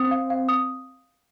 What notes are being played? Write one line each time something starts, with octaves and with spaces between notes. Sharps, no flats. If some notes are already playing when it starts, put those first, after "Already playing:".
Already playing: C4 D#6
F5
F5
D#6